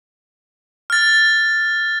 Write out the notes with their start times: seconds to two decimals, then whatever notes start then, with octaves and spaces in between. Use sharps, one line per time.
0.90 F6 A6